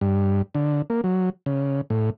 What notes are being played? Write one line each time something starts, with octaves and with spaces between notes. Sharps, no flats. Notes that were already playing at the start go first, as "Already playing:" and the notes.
G2
D3
A#3
F#3
C#3
A2